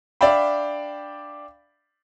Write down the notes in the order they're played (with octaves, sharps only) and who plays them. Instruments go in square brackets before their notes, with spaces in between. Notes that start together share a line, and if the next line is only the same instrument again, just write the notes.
[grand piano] D4 D5 E5 F5 G5 B5